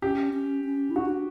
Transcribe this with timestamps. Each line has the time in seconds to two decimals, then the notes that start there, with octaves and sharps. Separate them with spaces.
0.02 C#4 G4
0.33 C#4
0.65 C#4
0.90 E4
0.96 D4 F#4
1.09 D4